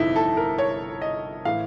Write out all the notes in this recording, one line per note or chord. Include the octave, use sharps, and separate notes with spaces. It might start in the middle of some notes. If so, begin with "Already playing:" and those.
Already playing: G1 F2 C3 F3 D#4 E4
A4
A#4
C#5
D#5
A2 E3 F5